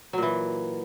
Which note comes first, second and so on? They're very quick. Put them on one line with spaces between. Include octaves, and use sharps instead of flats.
F#3 A#2 E3